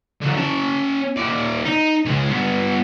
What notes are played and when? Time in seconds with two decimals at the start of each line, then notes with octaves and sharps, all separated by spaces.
0.21 D3 F#3
0.36 C#4 A5
1.17 D#2 D5
1.65 D#4
2.06 C#2 G#3
2.29 G2 B3